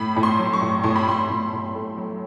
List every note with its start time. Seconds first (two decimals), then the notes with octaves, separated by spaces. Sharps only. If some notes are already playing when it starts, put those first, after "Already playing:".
Already playing: A2 B5
0.16 A2
0.23 C6
0.39 F#3
0.53 C#6
0.62 A2
0.84 A2 C6
0.96 B5
1.07 A2 C6
1.30 A2
1.53 A2
1.75 A3
1.97 F#3